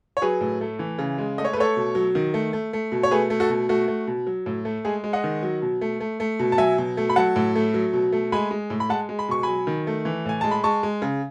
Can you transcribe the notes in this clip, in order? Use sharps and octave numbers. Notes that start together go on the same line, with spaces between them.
C#5
F#3 G#4 B4
A2
A3
E3
C#3
G#3
A3 D#5
C#5
B4
A3 A4 C#5
B2
F#3
D#3
A3
A3
A3
B2
C#5
A3 G#4 B4
A3
F#4 A4
B2
A3 F#4
A3
B2
F#3
A2
A3
G#3 G#4
G#3
D#5 F#5
D#3
F#3
B2
A3
A3
A3
B2
A5
F#3 E5 G#5
B2
A3
B5
F#3 F#5 A5
A2
A3
F#3
B2
A3
G#3 G#5 B5
G#3
A2
B5
G#3 F#5 A5
G#3
B5
B2 C#6
F#3 G#5 B5
D#3
A3
E3
A2 G#5
G#3 A5
B5
G#3 A5 C#6
G#3
C#3